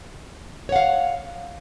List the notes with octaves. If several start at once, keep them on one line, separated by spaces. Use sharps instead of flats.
C#5 F5 F#5